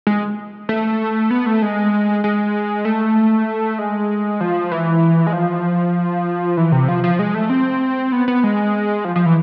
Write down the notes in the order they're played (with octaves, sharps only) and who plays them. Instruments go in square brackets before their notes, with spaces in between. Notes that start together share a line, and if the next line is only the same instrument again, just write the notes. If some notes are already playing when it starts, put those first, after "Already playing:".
[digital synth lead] G#3
A3
B3
A3
G#3
G#3
A3
G#3
F3
E3
G#3
F3
E3
C3
F3
F3
G#3
A3
C4
B3
B3
G#3
F3
F3
E3